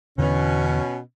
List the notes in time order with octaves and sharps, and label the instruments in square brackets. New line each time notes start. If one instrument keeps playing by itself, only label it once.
[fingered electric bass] E2 D3 E3 [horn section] B2 C#4